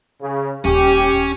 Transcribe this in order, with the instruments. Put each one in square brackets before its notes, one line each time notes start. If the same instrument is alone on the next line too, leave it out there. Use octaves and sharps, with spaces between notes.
[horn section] C#3
[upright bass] D#1 [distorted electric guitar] C#4 [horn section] G4